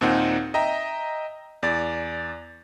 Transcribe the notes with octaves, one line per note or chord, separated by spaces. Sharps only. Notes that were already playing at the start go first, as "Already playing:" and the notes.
D#2 A#2 C4 D#4 F#5
D#5 E5 G5 A#5
E2 D5 A6